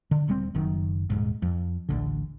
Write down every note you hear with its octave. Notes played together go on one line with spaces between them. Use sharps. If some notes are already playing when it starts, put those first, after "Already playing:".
D3
D#1 G2 G3 C4
F#1 F#2 D#3
D#1 G#1 G#2
F2
A1 D2 D3